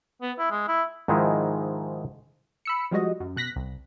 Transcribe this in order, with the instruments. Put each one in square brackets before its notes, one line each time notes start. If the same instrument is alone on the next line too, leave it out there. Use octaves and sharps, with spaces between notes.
[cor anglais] B3
E4
G#3
E4
[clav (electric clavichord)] G#2 D#3 F3 G#3 D#4 E4
[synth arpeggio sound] B5 E6 C#7
F3 G3 G#3 F#4 D#5
F#2
B2 F#6 A#6 B6
C2